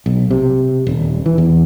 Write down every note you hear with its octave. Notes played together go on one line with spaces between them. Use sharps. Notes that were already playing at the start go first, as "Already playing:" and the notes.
B1
C3
D#1
E3
E2